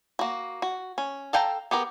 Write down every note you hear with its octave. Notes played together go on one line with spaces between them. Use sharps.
A#3 F#4
F#4
C#4
A4 F5 G5 A5 A#5
B3 G4 G#4 A#4